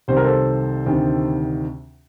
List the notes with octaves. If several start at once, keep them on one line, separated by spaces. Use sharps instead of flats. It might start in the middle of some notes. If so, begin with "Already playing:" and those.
C2 C3 D#3 C5
A#4
A4 C5
D2 C3 D#3